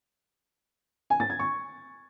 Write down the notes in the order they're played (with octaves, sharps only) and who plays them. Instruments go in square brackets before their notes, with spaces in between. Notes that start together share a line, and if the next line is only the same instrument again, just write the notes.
[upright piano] G#5
A6
G#6
C#6